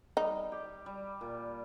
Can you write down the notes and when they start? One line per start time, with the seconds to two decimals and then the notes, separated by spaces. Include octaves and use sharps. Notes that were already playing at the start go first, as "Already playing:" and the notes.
0.17 G3 D#4
0.52 G4
0.86 G3
1.21 A#2